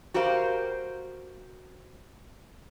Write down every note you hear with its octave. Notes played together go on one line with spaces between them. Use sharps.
F#4 G4 A#4 C5 F5